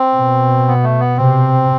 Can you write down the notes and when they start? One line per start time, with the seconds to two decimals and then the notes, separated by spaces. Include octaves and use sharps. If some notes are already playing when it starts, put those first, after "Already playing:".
Already playing: C4
0.17 B2
0.68 B3
0.83 A3
1.00 B3
1.17 C3 C4